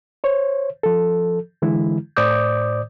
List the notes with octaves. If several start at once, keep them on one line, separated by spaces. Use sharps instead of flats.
C5 C#5
F3 A4
D3 E3 G#3 E4
A2 C5 D5 D6 D#6 G6